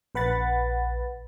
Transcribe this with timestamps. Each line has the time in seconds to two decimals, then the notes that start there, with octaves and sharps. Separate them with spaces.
0.15 A#1 B4 F#5 B5 A6